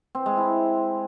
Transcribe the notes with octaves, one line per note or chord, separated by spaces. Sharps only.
C4
G#3
E4